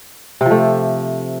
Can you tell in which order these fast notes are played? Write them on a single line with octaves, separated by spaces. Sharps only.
C3 F3 A3